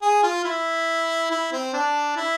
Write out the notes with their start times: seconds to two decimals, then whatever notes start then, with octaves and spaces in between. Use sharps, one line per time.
0.02 G#4
0.23 F4
0.45 E4
1.31 E4
1.52 C4
1.74 D4
2.16 E4